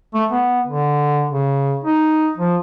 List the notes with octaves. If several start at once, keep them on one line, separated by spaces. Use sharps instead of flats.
A3
B3
D3
C#3
D#4
F3